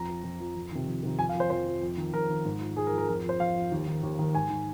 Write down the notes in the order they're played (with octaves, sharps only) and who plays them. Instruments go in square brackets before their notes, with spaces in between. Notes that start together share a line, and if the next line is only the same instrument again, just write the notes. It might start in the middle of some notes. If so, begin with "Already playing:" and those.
Already playing: [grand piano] F2 A#5
F3
F2
F3
F2
C3 D#3
F2
C3 D#3
F2 G#5
F5
F3
C5
F2 C5
F3
F2
D#3
F2 A#4
D#3
G#2
F3
G#2 G#4
A#4
F3
A#4
F2 A#4
F3 C5
F2 F5
F3
D#2
D#3
D#2
D#3
G#2 G#5
D#3